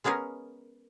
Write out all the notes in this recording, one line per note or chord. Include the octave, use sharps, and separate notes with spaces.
G#3 B3 C#4 G#4 A#4